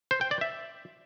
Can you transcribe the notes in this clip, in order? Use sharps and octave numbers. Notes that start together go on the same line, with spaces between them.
C5
G5
D5
E5